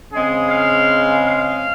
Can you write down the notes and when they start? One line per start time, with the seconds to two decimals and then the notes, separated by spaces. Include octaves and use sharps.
0.13 C#3 G#3 C4 G#4
0.50 F5
1.26 F5